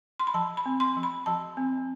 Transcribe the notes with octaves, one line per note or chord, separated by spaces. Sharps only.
C6
B5
F3 A5
B5
C4
C6
F3
B5
F3 A5
C4